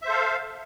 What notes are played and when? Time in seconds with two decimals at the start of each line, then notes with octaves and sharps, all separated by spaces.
0.02 E5
0.05 C5
0.09 A4
0.12 F5